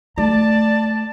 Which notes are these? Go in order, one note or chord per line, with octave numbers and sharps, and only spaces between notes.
A3 D5 A5